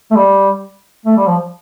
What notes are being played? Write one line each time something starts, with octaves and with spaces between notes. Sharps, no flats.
A3
G3
A3
G3
F3